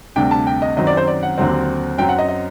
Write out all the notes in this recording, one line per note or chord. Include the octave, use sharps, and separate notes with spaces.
D2 C3 G3 D4 G5
A5
G5
D#5
F#2 D#3 F#3 C4 D#5
D5
C5
D5
F#5
D#2 D3 F#3 C4
F#2 F#3 C4 G5
F#5
D#5
D#5